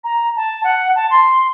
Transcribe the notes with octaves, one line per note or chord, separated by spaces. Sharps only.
A#5
A5
F#5
A5
C6